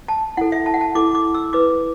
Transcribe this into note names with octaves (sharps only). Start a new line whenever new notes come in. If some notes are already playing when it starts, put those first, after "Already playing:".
A5
E4 A4 F#5
E5
A5
F#5
A5
E4 A4 D6
D6
E6
E4 B4 D6